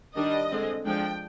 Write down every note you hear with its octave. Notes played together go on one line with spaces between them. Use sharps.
D#3 G3 D4 D#5
D3 G#3 C4
F3 G#3 D4 G5